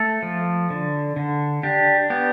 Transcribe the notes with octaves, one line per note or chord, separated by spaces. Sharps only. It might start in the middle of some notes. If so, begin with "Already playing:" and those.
Already playing: A3 A4
F3
D3
D3
D4 G4
B3 G4